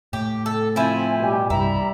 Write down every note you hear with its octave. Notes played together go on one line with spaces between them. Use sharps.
A2 G4
A4
F3 C4 E4 G#5
B2 G3 G4
C2 G2 G3 E4 A#5